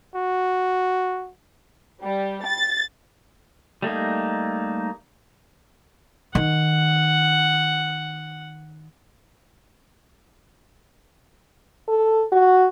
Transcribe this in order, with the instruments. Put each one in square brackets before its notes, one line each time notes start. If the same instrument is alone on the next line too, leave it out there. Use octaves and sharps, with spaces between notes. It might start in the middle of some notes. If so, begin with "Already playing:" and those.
[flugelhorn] F#4
[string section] G3
A6
[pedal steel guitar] G3 A3 A#3 D#4
[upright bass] D#3 [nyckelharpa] F#5
[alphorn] A4
F#4